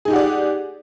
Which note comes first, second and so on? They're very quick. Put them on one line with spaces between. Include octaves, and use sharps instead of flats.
G#4 D#4 G4 F#5 D5